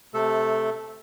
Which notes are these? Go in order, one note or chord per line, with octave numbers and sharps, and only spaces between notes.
C3 A3 A4